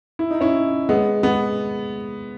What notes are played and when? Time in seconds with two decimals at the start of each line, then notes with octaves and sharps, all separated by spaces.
0.19 E4
0.31 D#4
0.41 C#4 E4
0.89 G#3 B3
1.23 G#3 B3